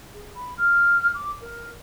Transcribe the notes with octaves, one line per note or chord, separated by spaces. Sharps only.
G#4
B5
F6
D6
A#4